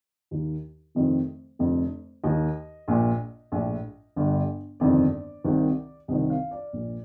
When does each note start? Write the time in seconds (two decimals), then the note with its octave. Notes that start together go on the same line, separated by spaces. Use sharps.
0.31 D#2 D#3
0.95 F1 F2 C3 D#3
1.59 F1 F2 D3
2.24 D#2 D#3 D#5
2.88 A#1 A#2
3.52 A#1 A2
4.16 G1 G2 D3
4.80 G1 F2 C3 D#3 D5
5.44 C2 C3 D#3
6.08 C2 C3 D#3 D#5
6.30 F5
6.51 D5
6.73 A#1 A#2